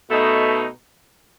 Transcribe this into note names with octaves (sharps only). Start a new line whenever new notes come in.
B2 A3 D#4